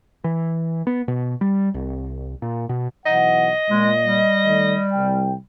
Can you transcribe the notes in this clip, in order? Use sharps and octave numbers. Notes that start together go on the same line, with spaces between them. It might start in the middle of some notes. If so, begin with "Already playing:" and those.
E3
B3
B2
G3
C2
A#2
B2
B1 E3 D#5 F#5
A#2 G#3
G3
D#3 A3 D5
C2 G5